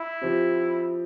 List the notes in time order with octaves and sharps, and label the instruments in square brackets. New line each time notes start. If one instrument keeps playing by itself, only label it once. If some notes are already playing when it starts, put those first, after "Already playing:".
Already playing: [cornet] E4
[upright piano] F3 C4 G4